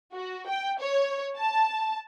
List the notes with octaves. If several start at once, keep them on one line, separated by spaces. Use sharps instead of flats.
F#4
G5
C#5
A5